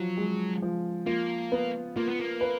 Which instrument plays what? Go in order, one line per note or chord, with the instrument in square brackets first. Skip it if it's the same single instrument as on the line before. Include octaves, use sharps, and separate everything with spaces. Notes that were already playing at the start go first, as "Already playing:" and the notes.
Already playing: [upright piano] F3 [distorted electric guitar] F#3
[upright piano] G#3
F3
[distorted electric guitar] A#3 [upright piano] F4
[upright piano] B3
[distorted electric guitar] A#3 [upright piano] F4
[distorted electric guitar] B3
A#3
[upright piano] B4